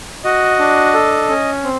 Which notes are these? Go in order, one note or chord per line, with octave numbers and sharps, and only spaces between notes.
F#4 D#5
D4
A4
C#4
C4